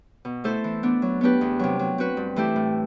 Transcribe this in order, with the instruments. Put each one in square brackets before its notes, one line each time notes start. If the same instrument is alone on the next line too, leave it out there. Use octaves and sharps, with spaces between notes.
[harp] B2
A3 E4 A4 C5
E3
B3 D4
F#3
B3 D4 G4 B4
E2
C3 F#3
F#3
C4 F#4 B4
G2
E3 A3 E4 G4
A2